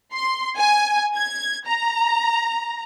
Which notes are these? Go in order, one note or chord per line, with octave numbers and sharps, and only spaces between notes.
C6
G#5
G#6
A#5